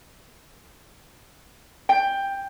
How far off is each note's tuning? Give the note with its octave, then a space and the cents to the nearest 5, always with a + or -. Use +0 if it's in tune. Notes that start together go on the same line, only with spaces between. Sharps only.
G5 +10